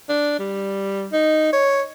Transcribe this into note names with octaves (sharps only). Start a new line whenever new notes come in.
D4
G3
D#4
C#5